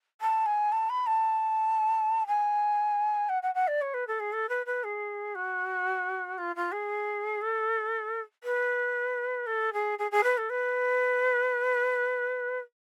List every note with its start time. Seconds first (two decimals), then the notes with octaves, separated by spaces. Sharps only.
0.21 A5
0.46 G#5
0.72 A5
0.89 B5
1.06 A5
2.27 G#5
3.29 F#5
3.42 F#5
3.54 F#5
3.67 D5
3.81 C#5
3.94 B4
4.07 A4
4.20 G#4
4.32 A4
4.49 B4
4.66 B4
4.84 G#4
5.35 F#4
6.38 F4
6.56 F4
6.72 G#4
7.41 A4
8.43 B4
9.46 A4
9.73 G#4
9.98 G#4
10.11 G#4
10.23 B4
10.37 A4
10.49 B4